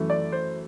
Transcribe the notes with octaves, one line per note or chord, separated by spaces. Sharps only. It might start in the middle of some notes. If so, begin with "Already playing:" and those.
Already playing: F#2 E3 A3
D5
C5